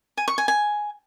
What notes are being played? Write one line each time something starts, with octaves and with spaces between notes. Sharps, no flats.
G#5
C#6
G#5
G#5